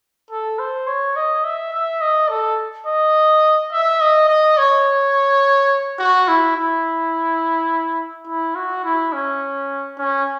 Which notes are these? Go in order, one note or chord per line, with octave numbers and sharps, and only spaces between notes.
A4
C5
C#5
D#5
E5
E5
D#5
A4
D#5
E5
D#5
D#5
C#5
F#4
E4
E4
E4
F#4
E4
C#4
C#4